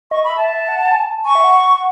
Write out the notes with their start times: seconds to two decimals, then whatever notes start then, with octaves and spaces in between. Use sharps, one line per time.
0.11 D#5 C#6
0.24 B5
0.30 E5
0.37 A5
0.49 E5
0.68 F#5
0.88 G#5
1.06 A5
1.25 G#5 C#6
1.35 E5
1.44 F#5